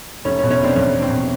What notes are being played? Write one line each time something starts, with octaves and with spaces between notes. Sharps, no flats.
F1 C#4
C#4
B2
C#4
F1 C4 D4
E2 C#4
F1
C4
B2